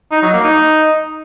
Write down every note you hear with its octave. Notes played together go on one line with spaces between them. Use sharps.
D#4
F#3
A#3
D#4